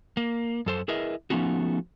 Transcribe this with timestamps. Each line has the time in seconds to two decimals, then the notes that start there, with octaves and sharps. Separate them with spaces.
0.17 A#3
0.66 F#2 A4 C5
0.88 E4 G#4 A#4 B4 D#5 E5
1.30 F3 A3 B3 C#4 D#4 F#4